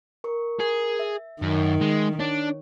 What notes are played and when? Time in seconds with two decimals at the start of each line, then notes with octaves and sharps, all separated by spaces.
0.24 A#4 C#6
0.60 G#4 A#4
0.99 E5
1.42 F#2 D#3
1.81 G#3
2.20 D4 C#5